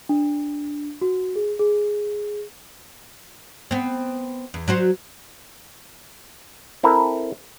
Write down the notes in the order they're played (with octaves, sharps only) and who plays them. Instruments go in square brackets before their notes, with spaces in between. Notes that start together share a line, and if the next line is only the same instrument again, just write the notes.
[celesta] D4
F#4
G#4
G#4
[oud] B3 C4
E2
F#3 F#4 C5
[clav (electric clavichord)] C4 E4 A4 A#4